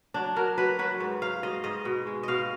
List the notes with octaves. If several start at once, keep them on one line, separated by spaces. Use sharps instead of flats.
F#3 D4
F#3 A#4
F#3 B4
F#3 B4
G#2
F#3 F5
G#2 D#5
G#2 D#5
B2
G#3
B2 D#5 F5